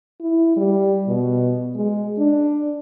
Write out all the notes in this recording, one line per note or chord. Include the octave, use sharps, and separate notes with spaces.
E4
G3
B2
G#3
D4